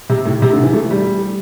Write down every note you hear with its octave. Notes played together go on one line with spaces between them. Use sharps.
C3
A2
C3
D3
E3
A3
G3